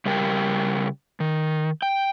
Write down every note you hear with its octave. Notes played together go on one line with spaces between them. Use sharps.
C#3 G3 G4 A#4 G5
D#3
G5